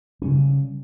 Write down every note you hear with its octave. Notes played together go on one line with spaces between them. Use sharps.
C#3 G3 C#4